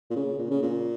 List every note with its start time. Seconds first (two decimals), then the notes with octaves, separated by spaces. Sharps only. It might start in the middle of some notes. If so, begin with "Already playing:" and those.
0.10 A#2
0.16 C#3
0.38 A#2
0.51 C#3
0.62 A#2